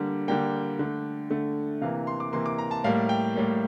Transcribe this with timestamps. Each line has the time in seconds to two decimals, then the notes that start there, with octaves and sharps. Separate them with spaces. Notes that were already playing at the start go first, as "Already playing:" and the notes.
Already playing: D3 G3 A#3
0.28 D3 G3 A#3 G5
0.79 D3 A3
1.30 D3 A3
1.81 C3 E3 A#3 F5
2.07 C6
2.20 D6
2.32 C3 E3 A#3 C6
2.46 D6
2.58 A#5
2.71 A5
2.84 A2 G3 A#3 F5
3.09 G5
3.35 A2 G3 A#3